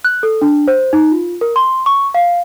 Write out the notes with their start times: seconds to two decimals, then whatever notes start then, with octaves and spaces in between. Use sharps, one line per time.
0.05 F#6
0.23 A4
0.41 D4
0.68 C5
0.93 D#4
1.12 F4
1.41 A#4
1.56 C6
1.86 C#6
2.14 F5